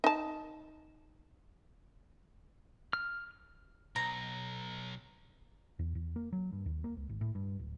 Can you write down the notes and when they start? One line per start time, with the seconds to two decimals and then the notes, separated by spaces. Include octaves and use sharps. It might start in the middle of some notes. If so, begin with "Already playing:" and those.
0.04 D#4 A5
2.93 F6
3.96 B1 A#5
5.79 E2
5.95 E2
6.16 A#3
6.33 F#3
6.53 G2
6.66 D#2
6.84 A#3
6.97 C#2
7.09 G#1
7.21 A2
7.35 G2
7.59 D1